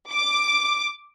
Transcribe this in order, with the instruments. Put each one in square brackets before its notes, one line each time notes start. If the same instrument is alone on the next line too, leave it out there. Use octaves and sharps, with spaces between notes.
[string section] D6